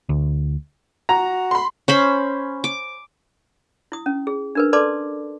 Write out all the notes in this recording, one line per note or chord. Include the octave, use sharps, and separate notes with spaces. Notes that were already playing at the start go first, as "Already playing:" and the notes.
D2
F#4 A#5
B5 C6
C#4 C5 B5
D6
E4 D#6
C#4
G#4
D4 A#4 B4
A4 B4 D5 A5 C6 D6